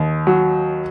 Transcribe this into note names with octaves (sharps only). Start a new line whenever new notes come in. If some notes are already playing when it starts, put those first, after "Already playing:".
Already playing: D#2
F#3